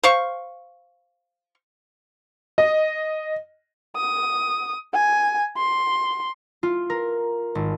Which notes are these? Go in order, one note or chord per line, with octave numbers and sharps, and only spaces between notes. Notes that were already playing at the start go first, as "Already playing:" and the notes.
C5 F5 C#6
D#5
D#6
G#5
C6
F4
A#4
G#1